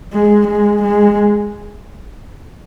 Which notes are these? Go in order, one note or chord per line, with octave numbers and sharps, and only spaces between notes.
G#3
G#3
G#3